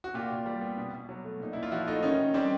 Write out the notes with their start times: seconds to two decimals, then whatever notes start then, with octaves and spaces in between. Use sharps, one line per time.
0.04 F#4
0.14 A#2 F4 G4
0.31 A#2
0.46 G3
0.61 B3
0.78 B2
0.93 B2
1.09 F#3
1.24 A3
1.40 A#2 D#4
1.53 A#2 E4
1.63 F4
1.71 F3 E4 F#4
1.87 A3 D#4 F4
2.02 D#3 C#4 D#4
2.19 D#3
2.34 G3 C4 D4